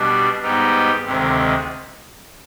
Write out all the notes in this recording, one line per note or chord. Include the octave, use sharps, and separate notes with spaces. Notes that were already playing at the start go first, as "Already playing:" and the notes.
Already playing: B2 G3 D4
G#2 G3 B3 D#4 G4
D2 C3 D#3 G#3